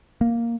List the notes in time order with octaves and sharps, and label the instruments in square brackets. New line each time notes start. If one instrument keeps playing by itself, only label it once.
[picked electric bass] A#3